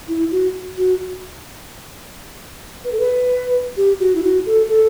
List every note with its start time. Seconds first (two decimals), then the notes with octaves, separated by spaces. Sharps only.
0.08 E4
0.31 F#4
0.78 F#4
2.85 B4
2.92 A4
3.00 B4
3.77 G4
4.00 F#4
4.15 E4
4.23 F#4
4.46 A4
4.69 A4